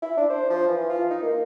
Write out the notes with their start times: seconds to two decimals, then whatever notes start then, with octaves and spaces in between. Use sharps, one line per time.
0.02 E4
0.17 D4
0.30 C5
0.50 F3
0.68 E3
0.89 F4
1.10 D#4
1.22 A#3